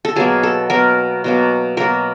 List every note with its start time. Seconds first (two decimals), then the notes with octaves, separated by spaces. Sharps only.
0.05 A4
0.16 B2 F#3 A#3 G#4
0.43 A4
0.70 B2 F#3 A#3 A#4
1.24 B2 F#3 A#3
1.77 B2 F#3 A#3 A#4